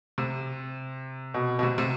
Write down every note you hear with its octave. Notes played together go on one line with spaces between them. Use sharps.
C3
B2
B2
C3
C3